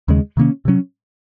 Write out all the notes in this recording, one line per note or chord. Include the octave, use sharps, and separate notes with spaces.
D#2 C#3 G#3
C3 D#3 A#3 C#4
C3 F#3 C#4